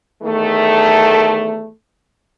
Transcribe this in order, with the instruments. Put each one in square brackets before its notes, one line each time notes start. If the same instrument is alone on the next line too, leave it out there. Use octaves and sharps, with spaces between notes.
[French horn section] E2 D#3 A3